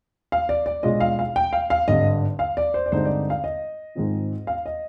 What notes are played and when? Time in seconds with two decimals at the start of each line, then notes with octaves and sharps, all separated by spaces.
0.32 F5
0.49 D5
0.66 D5
0.83 B1 B2 G#3 D4 F4 D#5
1.01 F5
1.19 F5
1.36 G5
1.53 F5
1.70 F5
1.88 G#1 G2 D3 D#5
2.39 F5
2.57 D5
2.74 C5
2.86 D5
2.92 G2 D3 G#3 C4 D#4 C5
3.05 D5
3.30 F5
3.44 D#5
3.95 G#2 D#3 G#3 C4 F4
4.47 F5
4.66 D#5